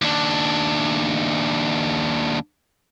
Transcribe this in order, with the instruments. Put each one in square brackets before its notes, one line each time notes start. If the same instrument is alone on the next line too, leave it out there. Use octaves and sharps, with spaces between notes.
[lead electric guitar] D#2 D4